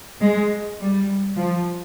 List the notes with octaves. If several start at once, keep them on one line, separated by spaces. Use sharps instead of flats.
G#3
G3
F3